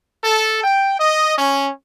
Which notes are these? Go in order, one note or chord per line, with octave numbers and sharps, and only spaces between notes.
A4
G5
D#5
C#4